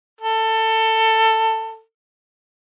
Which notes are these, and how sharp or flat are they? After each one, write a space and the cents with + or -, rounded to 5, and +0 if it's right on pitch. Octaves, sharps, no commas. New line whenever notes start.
A4 +20